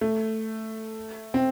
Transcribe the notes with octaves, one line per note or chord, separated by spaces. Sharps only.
A3
C4